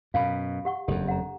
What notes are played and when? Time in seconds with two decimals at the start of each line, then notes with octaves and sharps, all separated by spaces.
0.14 F#2 B2 F5 B5
0.65 G4 F#5 C#6
0.88 F#1 F2 D4 G4 A4
1.08 F#5 A#5